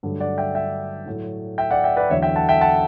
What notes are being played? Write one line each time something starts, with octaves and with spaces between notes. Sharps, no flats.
G2 D3 F#3 A3
D5 F#5
E5 G5
E5 G5
A2 F#3 A3
E5 G5
D5 F#5
E5 G5
B4 D5
E2 D3 F#3 A3 C#5 E5
E5 G5
F#5 A5
E5 G5
F#5 A5